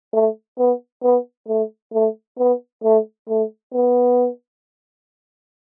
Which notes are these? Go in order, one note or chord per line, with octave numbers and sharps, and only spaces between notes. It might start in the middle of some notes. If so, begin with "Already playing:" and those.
A3
B3
B3
A3
A3
B3
A3
A3
B3